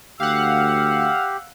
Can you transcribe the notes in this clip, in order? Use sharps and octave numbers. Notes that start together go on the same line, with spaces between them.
D2 G4 F5 F#5 E6